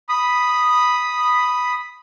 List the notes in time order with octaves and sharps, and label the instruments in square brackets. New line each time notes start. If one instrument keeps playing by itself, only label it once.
[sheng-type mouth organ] B5 D#6